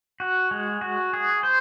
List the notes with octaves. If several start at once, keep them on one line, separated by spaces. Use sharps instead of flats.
F#4
G#3
F#4
G#4
C5